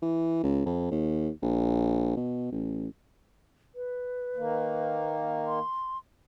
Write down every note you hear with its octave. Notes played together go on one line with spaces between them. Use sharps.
E3
C#2
F2
D#2
A#1
B2
A1
B4
D#3 A#3
C6